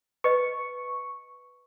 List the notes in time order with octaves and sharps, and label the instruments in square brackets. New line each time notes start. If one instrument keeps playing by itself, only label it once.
[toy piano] B4 D#5 [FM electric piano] C#6